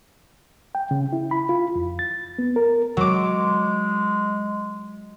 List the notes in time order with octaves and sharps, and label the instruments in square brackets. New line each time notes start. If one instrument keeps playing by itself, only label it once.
[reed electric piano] G5
C#3
E4
B5
F4
F2
A6
B3
A#4
[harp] F#3 D6 [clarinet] G#3